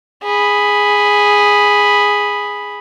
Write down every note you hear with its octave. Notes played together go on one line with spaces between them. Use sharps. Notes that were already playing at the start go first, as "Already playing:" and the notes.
G#4 B5